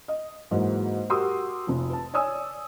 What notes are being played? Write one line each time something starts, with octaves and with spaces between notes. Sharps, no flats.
D#5
G#2 E3 F#3 G#3 A#3
F#4 G4 A#4 C6 D#6 E6
F1 F3
B4 A5
C#5 D5 G#5 D#6 E6